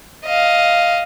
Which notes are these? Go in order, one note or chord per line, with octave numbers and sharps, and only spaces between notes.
D#5 F5